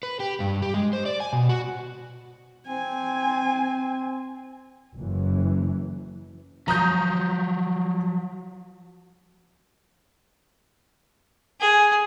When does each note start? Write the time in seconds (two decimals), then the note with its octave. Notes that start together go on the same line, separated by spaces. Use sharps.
0.03 B4
0.20 G4
0.40 G2
0.62 G4
0.74 G#3
0.93 C5
1.06 D5
1.20 G#5
1.33 B2
1.49 F#4
2.67 C4 G#5
4.96 F#1 F#2 E3
6.68 F3 F#3 A#5 D#6 G6
11.60 G#4